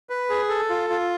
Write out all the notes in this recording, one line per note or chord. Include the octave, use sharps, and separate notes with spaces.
B4
G#4
A4
F4
F4